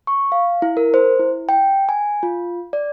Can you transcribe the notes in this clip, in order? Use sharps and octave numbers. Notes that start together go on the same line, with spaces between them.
C#6
F5
E4
A#4
C5
E4
G5
G#5
F4
D5